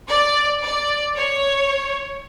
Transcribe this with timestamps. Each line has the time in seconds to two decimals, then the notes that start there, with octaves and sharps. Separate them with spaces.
0.08 D5
0.63 D5
1.16 C#5